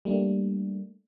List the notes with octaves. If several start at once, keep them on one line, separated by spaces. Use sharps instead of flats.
G3 A3 A#3 D4